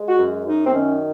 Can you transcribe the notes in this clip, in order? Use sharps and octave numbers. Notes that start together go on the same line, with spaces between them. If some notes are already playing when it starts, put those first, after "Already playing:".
Already playing: G#3
F#4
F#2
F#2 D#4
C4
D#3 C#4